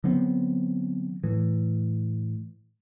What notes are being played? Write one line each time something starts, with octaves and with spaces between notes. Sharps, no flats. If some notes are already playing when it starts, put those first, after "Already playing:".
D3 F#3 B3 C4
A2 E3